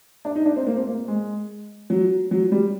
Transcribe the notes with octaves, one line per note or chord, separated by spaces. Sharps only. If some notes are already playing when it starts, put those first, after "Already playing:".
D4
D#4
D4
C4
A#3
C4
A#3
G#3
F#3
F#3
G3